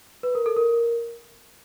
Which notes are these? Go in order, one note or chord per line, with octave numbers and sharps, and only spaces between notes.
B4
A#4
A4
A#4